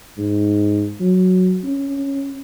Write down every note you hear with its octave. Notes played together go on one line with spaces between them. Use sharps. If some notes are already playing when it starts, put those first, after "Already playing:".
G#2
F#3
C#4